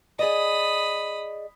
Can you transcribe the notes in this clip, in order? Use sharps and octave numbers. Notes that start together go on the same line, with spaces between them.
G#4 D5 D#5 B5 D#6